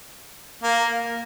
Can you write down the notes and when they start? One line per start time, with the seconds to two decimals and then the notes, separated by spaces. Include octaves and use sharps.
0.63 A#3